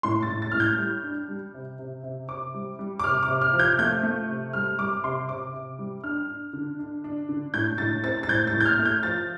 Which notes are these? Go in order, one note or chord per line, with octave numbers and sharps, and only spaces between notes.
A2 C6
A6
A2
A6
A2 F6
G6
G3
D4
G3
C3
C3
C3
C3 D6
G3
G3
D6
C3 F6
D6
C3
F6
F3
G6
A3 G6
A3
C3
G3 F6
G3 D6
C3 C6
C3 D6
C3
G3
D4 F6
D4
D3
D4
D4
D3
A2 G6
A2 A6
C4 A6
A6
A2 G6
A6
A2
G6
F6
A3
G6
F3 A6